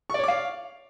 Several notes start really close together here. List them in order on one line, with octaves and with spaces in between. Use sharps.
C#6 D5 C#5 D6 F5